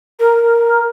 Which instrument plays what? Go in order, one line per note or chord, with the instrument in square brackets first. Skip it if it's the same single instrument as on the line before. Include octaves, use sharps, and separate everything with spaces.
[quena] A#4